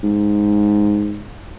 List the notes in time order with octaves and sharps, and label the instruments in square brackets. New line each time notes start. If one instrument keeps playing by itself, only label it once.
[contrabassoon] G#2